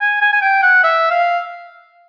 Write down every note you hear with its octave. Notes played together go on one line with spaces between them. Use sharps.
G#5
G#5
G#5
G5
F#5
E5
F5